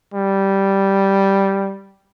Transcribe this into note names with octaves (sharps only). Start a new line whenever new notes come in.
G3